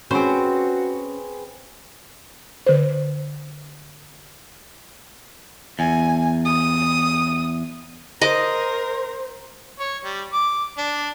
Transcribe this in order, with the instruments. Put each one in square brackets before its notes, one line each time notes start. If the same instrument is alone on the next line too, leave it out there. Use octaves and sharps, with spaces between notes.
[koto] C4 C5 [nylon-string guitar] C#4 [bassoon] F#4 [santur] G#4 B4
[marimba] D3 B4 C5
[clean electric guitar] E2 [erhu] G#5
[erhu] D#6
[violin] A#4 [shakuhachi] C5 [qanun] D#5 D6
[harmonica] C#5
G3
D6
D4